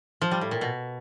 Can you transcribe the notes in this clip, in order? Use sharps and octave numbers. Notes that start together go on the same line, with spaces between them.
F3
G3
A2
A#2
B2